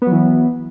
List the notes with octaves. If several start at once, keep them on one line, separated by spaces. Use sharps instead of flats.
E3 F#3 B3